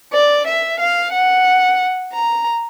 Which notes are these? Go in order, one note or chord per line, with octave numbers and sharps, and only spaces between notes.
D5
E5
F5
F#5
A#5